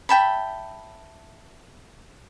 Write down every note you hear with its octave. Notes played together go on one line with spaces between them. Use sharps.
E5 G5 A5 B5